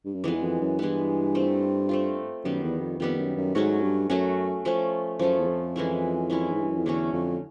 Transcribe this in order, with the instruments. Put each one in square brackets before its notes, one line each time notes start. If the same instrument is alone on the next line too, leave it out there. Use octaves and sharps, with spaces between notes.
[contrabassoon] G2
F#2
[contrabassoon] F2 [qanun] E3 G#3 B3
[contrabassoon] E2
F2
F#2
[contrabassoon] G2 [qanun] E3 G#3 B3
[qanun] A3 C4 F4
A3 C4 F4
[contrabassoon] F#2 [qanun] D#3 G3 B3
[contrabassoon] E2
F2
[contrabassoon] F2 [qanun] D#3 G3 B3
[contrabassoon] F#2
F#2
[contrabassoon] G#2 [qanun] F#3 A3 C#4 F#4
[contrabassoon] G2
[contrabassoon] F#2 [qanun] F#3 A3 C#4 F#4
[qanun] F3 A3 C#4
[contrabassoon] F#2 [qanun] F3 A3 C#4
[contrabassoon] E2
F2
[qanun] E3 G#3 C#4 E4
E3 G#3 C#4 E4
[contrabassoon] G#2
G2
F#2
F2
[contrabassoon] E2 [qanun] D3 F#3 A3 C#4
[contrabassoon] F2